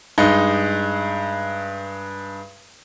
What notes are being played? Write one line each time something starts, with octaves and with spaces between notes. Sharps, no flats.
G2 G#3 D#4